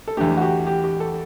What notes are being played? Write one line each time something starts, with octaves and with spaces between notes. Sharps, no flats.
A4
E2 D3 A3 G4
F#4
G4
G4
G4
A4